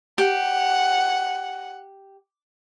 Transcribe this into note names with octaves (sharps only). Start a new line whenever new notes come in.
G4 F#5